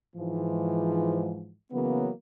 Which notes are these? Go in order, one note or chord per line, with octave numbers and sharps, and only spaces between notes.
G#2 E3 F3
C#3 E3 F#3 A#3 B3